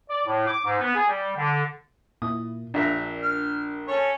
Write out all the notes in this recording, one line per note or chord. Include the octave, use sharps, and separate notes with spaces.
D5
A2
D6
G#2
B3
G#4
G3
D3
A#2 A#3 E4 D#6
A#1 D4 A#4 E5 A#5
F6
C#4 A4 C#5